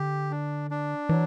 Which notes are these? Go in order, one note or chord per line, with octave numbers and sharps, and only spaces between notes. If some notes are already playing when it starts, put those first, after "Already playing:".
Already playing: D3 G4
D4
D4
E3 F#3